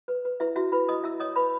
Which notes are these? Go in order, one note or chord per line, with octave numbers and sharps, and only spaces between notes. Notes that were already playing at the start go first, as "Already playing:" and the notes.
B4
B4
E4 B4 E5
E4 F#4 E5
E4 B4 B5
E4 D#5 D#6
E4 E5 E6
C#5 D#5 D#6
B4 B5